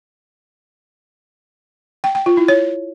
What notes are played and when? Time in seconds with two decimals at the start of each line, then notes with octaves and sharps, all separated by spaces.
2.04 G5
2.15 G5
2.26 F4
2.37 E4
2.48 C#5